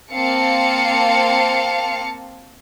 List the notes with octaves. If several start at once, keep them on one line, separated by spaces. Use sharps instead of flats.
A#3 C4 F5 A5 C#7